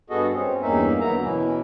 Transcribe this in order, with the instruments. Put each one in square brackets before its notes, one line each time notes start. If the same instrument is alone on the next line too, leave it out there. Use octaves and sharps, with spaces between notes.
[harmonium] G2 B3 F#4 G#4 A4 D#5
C4 C#4
E2 G2 A#3 C#4 D#4 E5
D2 F#3 A#3 B3 E5 A#5
B2 E3 C#4 E4